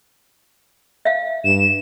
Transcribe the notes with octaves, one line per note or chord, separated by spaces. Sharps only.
E5 F5
G2 E7